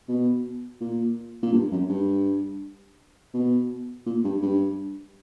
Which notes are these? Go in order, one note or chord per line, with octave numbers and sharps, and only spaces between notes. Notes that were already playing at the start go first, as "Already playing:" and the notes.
B2
A#2
A#2
G2
F#2
G2
B2
A#2
G2
G2